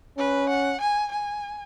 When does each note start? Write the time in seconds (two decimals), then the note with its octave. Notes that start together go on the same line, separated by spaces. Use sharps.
0.18 C#4 B4
0.49 F#5
0.81 G#5
1.12 G#5